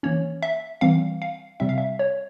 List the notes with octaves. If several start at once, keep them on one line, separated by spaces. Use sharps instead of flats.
E3 A#3 C#4 C#5
E5
E3 G3 C4 F5
F5
C3 G3 C4 E5
F5
E5
C#5